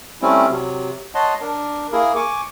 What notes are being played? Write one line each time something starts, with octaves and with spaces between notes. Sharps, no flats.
G3 A3 C4 C#4 E4
C3 F#3
C#5 D#5 F#5 A5 C6
D4 A#4
A#3 E4 G#4 A#4
G#5 C#6 D6